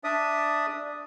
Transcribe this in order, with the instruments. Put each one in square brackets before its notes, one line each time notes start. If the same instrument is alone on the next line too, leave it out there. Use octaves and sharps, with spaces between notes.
[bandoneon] D4 D5 E5 D#6